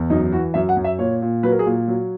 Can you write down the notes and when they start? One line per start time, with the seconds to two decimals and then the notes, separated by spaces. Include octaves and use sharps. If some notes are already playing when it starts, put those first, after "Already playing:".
Already playing: E2
0.10 F#2 D#4
0.32 E3 F#4
0.54 F#2 E5
0.69 F#5
0.77 F#2
0.84 E5
0.99 A#2 C#5
1.22 A#2
1.43 F#3 B4
1.52 A#4
1.59 G#4
1.66 A#2
1.88 F#3